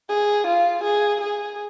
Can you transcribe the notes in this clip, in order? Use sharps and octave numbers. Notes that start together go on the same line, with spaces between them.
G#4
F4
G#4
G#4